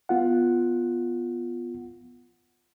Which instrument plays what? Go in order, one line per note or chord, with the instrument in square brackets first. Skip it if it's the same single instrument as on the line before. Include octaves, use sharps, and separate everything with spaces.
[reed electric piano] B3 F4 F#5